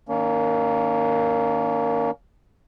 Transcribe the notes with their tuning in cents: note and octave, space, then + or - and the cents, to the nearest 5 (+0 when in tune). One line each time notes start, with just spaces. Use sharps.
D#3 +0 A#3 +0 C#4 +40